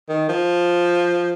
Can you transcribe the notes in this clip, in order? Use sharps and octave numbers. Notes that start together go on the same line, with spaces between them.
D#3
F3